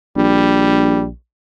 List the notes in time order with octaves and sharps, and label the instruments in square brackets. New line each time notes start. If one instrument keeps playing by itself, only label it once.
[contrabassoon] A#1 [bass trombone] G3